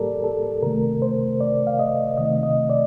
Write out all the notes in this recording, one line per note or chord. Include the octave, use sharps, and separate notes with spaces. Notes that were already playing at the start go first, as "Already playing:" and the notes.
Already playing: A2 G3 A#3 G4 A4 A#4 D5
A4
C3 D#3 A3 A#4
C5
D5
F5
D#5
C3 D#3 A3 D#5
D#5
D5